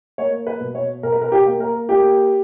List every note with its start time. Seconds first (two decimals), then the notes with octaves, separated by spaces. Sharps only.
0.18 A#3 C#5
0.47 B4
0.61 B2
0.75 C#5
1.03 B2 A#4
1.12 B4
1.22 A#4
1.32 G4
1.46 A#3
1.60 A#4
1.89 A#3 G4